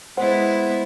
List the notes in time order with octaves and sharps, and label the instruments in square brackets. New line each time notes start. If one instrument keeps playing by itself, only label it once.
[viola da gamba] G#3 B3 E4 [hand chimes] C5 F#5